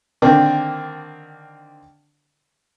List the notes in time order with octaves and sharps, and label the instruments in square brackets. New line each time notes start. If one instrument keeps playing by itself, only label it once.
[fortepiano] D3 D#3 A#3 C4 D4